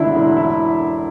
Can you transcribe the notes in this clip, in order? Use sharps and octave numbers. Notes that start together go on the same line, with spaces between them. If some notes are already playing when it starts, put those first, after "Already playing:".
Already playing: E1 D2 D3 D4 E4
E1
E4